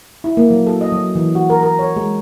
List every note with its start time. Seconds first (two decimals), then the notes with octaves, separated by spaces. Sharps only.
0.24 E4
0.37 A#3
0.51 F#3
0.67 A4
0.81 D#5
0.93 F#3
1.15 E3
1.35 F#4
1.50 A#4
1.63 A#4
1.79 C#5
1.96 G#3